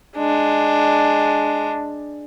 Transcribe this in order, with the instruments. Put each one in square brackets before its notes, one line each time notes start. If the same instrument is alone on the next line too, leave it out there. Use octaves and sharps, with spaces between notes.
[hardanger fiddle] G#3 D4